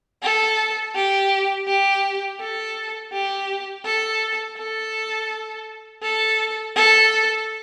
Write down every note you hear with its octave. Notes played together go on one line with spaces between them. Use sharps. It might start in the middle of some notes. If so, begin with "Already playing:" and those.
A4
G4
G4
A4
G4
A4
A4
A4
A4